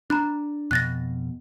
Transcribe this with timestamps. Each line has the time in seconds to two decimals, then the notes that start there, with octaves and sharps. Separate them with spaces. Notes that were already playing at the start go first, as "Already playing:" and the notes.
0.10 D4 A#5 B5 F#6
0.71 F2 B2 F#6 A6 A#6